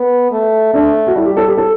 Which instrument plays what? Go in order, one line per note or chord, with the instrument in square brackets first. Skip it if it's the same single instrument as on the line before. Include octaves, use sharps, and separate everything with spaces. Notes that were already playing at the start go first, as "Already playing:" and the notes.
Already playing: [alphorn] B3
A3
[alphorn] A3 [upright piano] D4
[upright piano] F#4
[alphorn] G3 [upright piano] E4
[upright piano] G4
A4
G4
A4